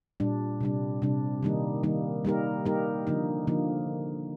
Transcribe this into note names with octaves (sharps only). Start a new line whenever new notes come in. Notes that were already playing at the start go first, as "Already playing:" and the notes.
A#2 G3 D4
C3 G3 D4
C3 G3 D4
D#3 G3 A#3 D#4
D#3 G3 A#3 D#4
G3 A#3 D#4 G4 A#4
G3 A#3 D#4 G4 A#4
D3 F3 A#3 D#4
D3 F3 A#3 D#4